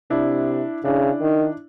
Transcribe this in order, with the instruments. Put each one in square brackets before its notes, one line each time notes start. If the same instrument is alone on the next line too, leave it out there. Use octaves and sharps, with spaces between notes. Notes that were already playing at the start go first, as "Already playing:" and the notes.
[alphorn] C3 [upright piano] D4 E4
[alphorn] C#3 [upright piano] D4 E4
[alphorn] D#3